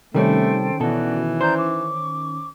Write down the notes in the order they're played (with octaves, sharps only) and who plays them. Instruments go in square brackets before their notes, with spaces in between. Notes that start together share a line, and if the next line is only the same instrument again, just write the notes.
[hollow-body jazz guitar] C3 G3 [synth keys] D#3 C#4 [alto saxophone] A3 [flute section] A4 C5 G5
[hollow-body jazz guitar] B2 A4 [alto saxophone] E3 [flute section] F#4 D5
[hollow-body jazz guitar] C5 [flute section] D5 A#5 G6
[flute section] C#6 D6